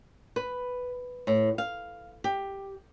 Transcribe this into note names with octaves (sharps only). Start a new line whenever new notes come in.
B4
A2
F5
G4